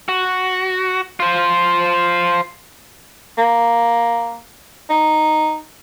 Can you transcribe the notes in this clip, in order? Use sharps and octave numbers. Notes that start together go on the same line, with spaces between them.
F#4
F4 C5
A#3
D#4